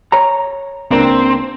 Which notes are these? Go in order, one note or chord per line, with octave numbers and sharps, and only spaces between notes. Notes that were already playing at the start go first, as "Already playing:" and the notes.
C#5 A#5
C#2 A#3 C4 D4